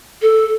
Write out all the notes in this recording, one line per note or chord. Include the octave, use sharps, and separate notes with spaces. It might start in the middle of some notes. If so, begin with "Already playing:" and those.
A4